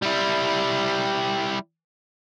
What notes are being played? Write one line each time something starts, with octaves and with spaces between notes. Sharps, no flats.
G3 E4